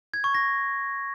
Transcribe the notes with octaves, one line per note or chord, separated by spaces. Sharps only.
G#6
C#6
A#6